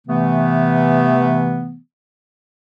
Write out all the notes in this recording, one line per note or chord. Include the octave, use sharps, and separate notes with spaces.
C3 E3 A3 B3